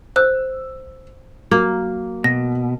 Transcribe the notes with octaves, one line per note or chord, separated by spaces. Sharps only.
C5 E6 F#6
F#3 A#3
B2 A#6